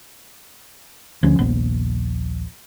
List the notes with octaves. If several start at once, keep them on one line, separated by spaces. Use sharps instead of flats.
D2 F3 C#4
D#1 A#1 B3